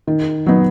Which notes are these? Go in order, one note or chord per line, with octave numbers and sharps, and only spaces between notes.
D#3
F#3 B3 D#4